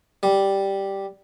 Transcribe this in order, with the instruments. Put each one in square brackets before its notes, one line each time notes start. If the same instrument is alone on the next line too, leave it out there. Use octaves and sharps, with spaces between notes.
[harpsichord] G3